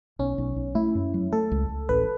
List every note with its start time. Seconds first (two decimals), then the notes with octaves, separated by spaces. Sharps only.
0.19 B1 C#4
0.38 B1
0.56 B1
0.75 A3 E4
0.95 F#2
1.14 F#3
1.32 A3 A4
1.52 C#2
1.69 C#2
1.89 A1 B4